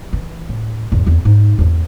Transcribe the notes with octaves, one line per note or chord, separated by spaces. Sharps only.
E3
A2
E2 G#2
E2 C4
G#2 D#4
E2 G#2